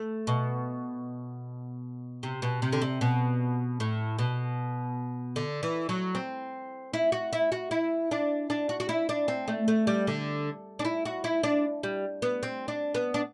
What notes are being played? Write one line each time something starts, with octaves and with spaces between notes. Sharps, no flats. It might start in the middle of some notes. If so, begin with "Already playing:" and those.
Already playing: A3
B2
C3
B2
C3
D3
C3
B2
A2
B2
D3
E3
F#3
C4
E4
F#4
E4
F#4
E4
D4
D4
F#4
F#4
E4
D4
C4
A3
A3
G3
D3
D4
E4
F#4
E4
D4
G3
B3
C4
D4
B3
D4